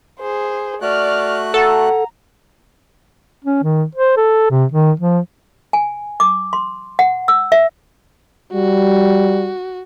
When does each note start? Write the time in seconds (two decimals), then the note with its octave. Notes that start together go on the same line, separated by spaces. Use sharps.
0.20 G#4 C5
0.82 A3 F#4 D5 F6 F#6
1.54 A4 F#5 A#5
3.45 C#4
3.63 D#3
3.95 C5
4.17 A4
4.50 C3
4.72 D#3
5.00 F3
5.73 G#5
6.20 D6
6.53 C6
6.99 F#5
7.28 E6
7.52 E5
8.53 G3 F#4